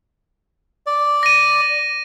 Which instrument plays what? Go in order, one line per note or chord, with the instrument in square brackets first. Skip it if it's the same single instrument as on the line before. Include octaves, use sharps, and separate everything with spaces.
[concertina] D5
[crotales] A#6 D#7